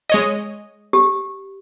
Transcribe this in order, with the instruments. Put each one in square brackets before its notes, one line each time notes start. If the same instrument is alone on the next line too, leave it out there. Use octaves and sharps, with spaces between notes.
[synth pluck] G#3 C#5 D#5
[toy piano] G4